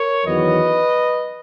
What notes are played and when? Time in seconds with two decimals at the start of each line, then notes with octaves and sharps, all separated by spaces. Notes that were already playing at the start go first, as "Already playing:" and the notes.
Already playing: A#4 C#5
0.26 E2 D#3 F#3 B4 D#5